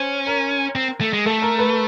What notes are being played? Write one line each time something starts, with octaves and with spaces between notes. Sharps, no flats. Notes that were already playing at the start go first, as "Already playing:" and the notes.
Already playing: C#4 C5
A#4
C4
A3
G#3
A3 A4
A#4
B4